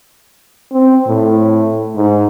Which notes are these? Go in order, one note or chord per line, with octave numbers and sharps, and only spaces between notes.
C4
A2
G#2